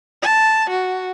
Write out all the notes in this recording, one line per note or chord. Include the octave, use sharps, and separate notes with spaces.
A5
F#4